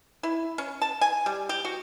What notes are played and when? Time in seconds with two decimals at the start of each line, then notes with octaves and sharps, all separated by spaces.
0.23 E4
0.58 C#4
0.82 A5
1.01 G#5
1.26 G3
1.49 G4
1.65 F#4